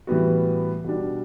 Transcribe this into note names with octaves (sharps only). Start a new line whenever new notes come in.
A2 E3 G3 B3 F#4
B2 G3 D4